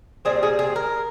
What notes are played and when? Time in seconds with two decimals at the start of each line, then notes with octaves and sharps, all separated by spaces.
0.25 A#2 G3 C4 G#4
0.43 G#4
0.59 G#4
0.76 A#4